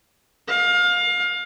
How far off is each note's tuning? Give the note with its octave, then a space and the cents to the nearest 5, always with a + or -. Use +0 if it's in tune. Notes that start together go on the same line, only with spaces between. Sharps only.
F5 +25